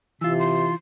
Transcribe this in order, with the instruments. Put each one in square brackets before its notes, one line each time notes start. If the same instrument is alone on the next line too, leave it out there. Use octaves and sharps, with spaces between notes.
[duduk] C3 [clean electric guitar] E3 F4 [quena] E6
[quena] C6